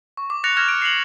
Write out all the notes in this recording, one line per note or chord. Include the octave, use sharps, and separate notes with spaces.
C#6
D6
F#6 A6 A#6 C#7 F7
F6 F#6 G#6 A#6 E7
D7
C7 F7 F#7